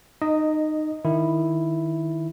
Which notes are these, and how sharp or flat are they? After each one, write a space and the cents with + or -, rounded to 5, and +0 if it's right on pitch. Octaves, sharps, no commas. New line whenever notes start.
D#4 -20 D#5 +0
D#3 +0 E4 +0